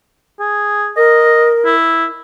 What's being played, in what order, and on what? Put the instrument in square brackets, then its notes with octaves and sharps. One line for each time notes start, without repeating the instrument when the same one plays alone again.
[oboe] G#4
[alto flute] A#4 [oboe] D#5
[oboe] E4